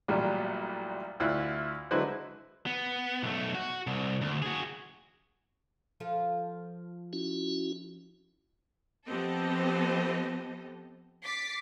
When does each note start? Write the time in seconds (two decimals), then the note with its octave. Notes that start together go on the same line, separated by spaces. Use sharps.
0.08 A1 A#2 F#3 G3
1.20 D2 E4 F4 F#6
1.91 D3 F#3 G#3 E4 B4 C5
2.66 B3
3.23 B1 A3
3.55 F#4
3.87 C2
4.21 D2
4.42 F#4 G#4
6.00 F3 F4 A4
7.13 C#4 E4 F#4
9.08 F3 B3 C4 G4 A4 D#5
11.24 D6 A6 B6 C7